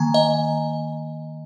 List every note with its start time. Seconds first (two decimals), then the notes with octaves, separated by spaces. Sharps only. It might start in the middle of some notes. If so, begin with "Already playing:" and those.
Already playing: D#3 A#3 G#5 A#5
0.14 D#5